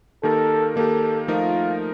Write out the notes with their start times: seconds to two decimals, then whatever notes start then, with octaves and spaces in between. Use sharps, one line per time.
0.23 D#3 A#3 D#4 G4 A4 A#4
0.76 D#3 A#3 D#4 G4 A4
1.28 F3 A3 D#4 F4 A#4